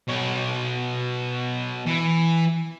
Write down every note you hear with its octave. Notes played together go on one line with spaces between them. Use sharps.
B2 C#5
E3